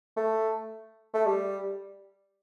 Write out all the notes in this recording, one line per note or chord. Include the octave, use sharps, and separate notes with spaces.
A3
A3
G3